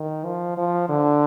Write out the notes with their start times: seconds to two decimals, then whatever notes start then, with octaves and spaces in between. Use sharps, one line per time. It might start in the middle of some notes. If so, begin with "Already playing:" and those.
Already playing: D#3
0.25 F3
0.57 F3
0.89 D3